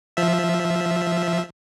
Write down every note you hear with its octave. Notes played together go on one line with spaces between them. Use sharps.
F3 E5